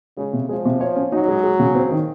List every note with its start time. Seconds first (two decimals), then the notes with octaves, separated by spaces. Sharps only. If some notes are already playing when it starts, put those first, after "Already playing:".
0.17 C#3 G#3
0.33 C3
0.49 F3 G#3
0.65 C3
0.81 C#5
0.96 C#4
1.12 F#3 D#4
1.28 G#3
1.44 G#3
1.60 C#3
1.75 C4
1.91 D#3